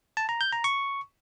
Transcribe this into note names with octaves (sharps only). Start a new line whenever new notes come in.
A5
A#5
G6
A#5
C#6